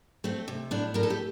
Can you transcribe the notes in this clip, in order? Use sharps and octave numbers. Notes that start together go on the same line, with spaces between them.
A3 C4
C3
A2 D4
A2 A#4
A4
G4